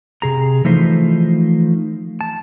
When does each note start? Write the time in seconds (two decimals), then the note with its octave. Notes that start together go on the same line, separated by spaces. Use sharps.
0.22 C3 G#4 A#5
0.65 E3 F3 A3 D#4 C5
2.21 A5